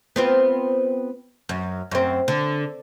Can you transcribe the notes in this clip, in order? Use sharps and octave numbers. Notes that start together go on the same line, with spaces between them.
B3 C4 F4
F#2
F#2 C4
D3